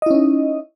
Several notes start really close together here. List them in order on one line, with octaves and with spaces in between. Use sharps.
D#5 E4 C#4 D#4